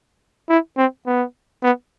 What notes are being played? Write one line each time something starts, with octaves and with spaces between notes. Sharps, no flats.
E4
C4
B3
B3